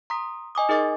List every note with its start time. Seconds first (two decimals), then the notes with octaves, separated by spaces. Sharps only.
0.10 A#5 C6 D#6 B6
0.55 D#5 G#5 D6 D#6
0.69 D#4 G#4 A#4 D#5 D6 A6